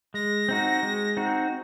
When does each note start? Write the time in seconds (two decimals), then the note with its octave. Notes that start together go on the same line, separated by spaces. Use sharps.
0.14 G#3 A#6
0.49 C4 D#4 F#4
0.83 G#3
1.17 C4 D#4 F#4